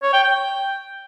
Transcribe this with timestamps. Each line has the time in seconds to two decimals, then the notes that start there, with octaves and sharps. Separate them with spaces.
0.03 C#5
0.13 G5
0.23 G5